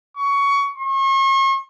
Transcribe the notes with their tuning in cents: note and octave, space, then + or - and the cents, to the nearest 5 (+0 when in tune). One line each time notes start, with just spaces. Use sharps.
C#6 +20
C#6 -40